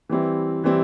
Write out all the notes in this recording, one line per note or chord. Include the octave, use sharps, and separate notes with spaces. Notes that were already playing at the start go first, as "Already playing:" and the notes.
E3 G3 C4 E4
E3 G3 C4 E4